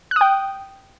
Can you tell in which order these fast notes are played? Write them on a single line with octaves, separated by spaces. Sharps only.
F#6 D#6 G5